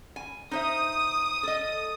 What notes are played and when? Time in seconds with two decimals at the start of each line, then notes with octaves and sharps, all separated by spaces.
0.16 G#5
0.51 D#4 C5 E5 D#6
1.43 A4 D#5